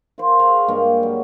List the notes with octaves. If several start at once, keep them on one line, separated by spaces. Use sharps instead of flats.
F4 A#4 C5
F4 G#4 F5 C#6
G2 G#3 A#3 G5
F#3